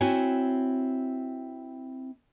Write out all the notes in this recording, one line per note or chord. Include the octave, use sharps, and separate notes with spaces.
C4 E4 F#4 C#5 G#5